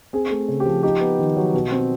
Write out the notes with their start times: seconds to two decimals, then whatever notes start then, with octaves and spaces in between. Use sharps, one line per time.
0.13 C4 G#4
0.31 A3
0.48 C#3
0.60 G4
0.65 F3
0.83 D#4 G4
1.01 B3
1.19 D#3
1.37 F#3
1.54 B2
1.72 C4